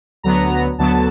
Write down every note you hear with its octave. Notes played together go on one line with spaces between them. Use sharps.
D2 D3 F#3 B3 A#5
D2 D3 F#3 B3 A5